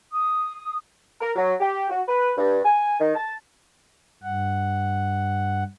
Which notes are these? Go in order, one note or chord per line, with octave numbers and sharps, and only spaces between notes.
D#6
A#4
F#3
G4
F#4
B4
G2
G#5
D#3
A5
G2 F#5